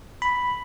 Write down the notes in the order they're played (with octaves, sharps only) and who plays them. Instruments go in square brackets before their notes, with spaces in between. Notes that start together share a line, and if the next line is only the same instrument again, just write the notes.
[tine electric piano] B5